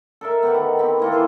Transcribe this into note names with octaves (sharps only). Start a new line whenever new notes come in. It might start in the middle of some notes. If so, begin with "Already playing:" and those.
A4 A#4 E5
B3 G4 F#5
D#3
B3 C4 G4
E3 A#3 A4
F4 G#4 A4 C5